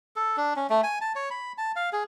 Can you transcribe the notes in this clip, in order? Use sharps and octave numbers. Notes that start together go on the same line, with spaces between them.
A4
D4
C#4
A3
G#5
A5
C#5
B5
A5
F5
G#4